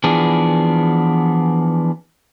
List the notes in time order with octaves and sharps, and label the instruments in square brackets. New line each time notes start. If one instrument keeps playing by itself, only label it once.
[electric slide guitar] E3 F3 B3 D4 G#4